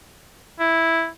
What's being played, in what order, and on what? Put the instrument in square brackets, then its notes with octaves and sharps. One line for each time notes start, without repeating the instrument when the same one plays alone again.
[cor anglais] E4